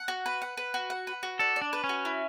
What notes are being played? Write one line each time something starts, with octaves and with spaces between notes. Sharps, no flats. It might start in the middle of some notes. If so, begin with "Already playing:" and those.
Already playing: F#5
F#4
B4
F#5
B4
F#4
F#5
B4
F#4
A4 D5
D5
D4
B4
C#4
F#4
E4